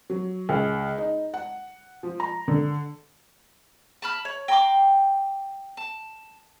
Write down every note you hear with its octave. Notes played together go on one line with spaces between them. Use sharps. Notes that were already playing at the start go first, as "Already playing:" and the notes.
F#3
C#2
D#4
F#5
F3
A#5
D3
A5 B5 F6
C#5
G5 A#5 C6 D6
A5